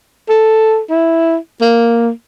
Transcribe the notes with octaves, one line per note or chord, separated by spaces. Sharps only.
A4
E4
A#3